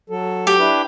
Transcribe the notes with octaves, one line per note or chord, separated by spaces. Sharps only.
F#3 A4
G4
D4 E4 B4